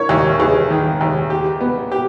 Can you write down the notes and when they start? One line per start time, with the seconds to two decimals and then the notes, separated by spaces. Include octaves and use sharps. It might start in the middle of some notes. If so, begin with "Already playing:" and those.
Already playing: E4 A#4 C#5
0.09 D#2
0.39 D#2 G#4 B4
0.70 D#3
1.01 D#2
1.30 G4
1.61 B3
1.92 G4